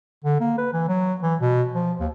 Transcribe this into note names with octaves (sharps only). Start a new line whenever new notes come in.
D3
A#3
B4
E3
F#3
E3
B2
F3
D#2